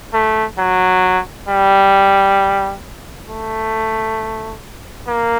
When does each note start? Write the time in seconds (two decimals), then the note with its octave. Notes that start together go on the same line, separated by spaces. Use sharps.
0.14 A3
0.58 F#3
1.48 G3
3.28 A3
5.07 A#3